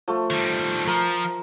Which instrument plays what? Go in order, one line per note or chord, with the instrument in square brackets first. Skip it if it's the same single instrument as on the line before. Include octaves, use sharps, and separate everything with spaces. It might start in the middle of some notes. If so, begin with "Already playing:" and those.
[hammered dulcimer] F3 A3
[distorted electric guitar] D#3 G3
[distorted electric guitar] F3 [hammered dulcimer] A#4